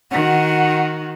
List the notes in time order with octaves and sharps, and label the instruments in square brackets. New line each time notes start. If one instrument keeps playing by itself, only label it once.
[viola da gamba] D#3 F#4 [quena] F#5